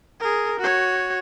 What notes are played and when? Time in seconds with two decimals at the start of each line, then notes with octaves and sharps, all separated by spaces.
0.20 G#4 A#4
0.60 F#4 C#5